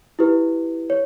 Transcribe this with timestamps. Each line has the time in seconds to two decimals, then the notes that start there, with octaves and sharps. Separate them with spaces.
0.19 E4 G4 B4
0.90 C#5